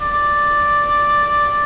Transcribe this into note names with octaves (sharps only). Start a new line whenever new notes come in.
D5